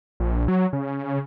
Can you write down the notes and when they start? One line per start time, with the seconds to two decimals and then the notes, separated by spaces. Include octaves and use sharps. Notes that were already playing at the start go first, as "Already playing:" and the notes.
0.20 A#1
0.48 F#3
0.73 C#3